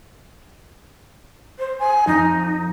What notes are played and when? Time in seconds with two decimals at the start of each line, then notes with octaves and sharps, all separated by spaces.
1.59 C5
1.79 G#5
2.07 F2 D#4